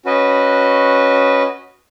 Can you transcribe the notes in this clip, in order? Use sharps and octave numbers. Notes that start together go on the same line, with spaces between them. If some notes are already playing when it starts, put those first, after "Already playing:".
C#4 F#4 B4 D#5